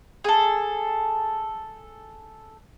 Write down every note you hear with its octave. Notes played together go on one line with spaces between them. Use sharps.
G#4 A4